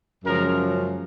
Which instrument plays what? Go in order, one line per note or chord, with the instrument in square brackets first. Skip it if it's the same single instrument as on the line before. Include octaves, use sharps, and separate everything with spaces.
[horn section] F#2 C#3 F3 G#3 A#4